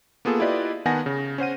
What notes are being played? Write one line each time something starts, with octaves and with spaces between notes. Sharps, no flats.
A#3 B3 F4 G#4 A4
E4 F4 G4 B4 D5 D#5
D#3 B3 F#5 G#5 A5 A#6
C#3
C#4 C5 F#5 D#7